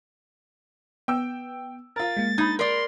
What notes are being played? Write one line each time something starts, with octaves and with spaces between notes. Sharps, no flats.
B3 G5 E6
F4 A#4 A6
G#3 A#3
D#4 B5 G#6
A#4 D5 C6